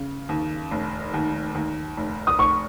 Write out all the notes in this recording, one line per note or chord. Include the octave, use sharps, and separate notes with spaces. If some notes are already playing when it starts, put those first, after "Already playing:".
Already playing: C#3
D#2
F1
D#2
D#2
F1
D#6
F1 C#6